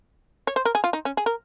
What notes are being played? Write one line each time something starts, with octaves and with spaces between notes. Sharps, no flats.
C#5
C5
A#4
G#4
F4
D#4
C#4
G#4
A#4